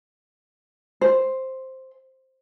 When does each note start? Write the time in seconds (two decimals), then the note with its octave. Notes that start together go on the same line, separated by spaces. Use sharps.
1.01 C5